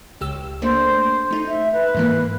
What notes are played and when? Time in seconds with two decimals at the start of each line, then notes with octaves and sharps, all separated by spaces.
0.21 C#2 G4 E6
0.62 A3 A#3 D4 C5
1.31 A3 D#4
1.47 E5
1.73 B4
1.95 G#2 E3 A#3